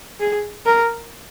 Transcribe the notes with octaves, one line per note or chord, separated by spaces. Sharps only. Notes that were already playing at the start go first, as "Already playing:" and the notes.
G#4
A#4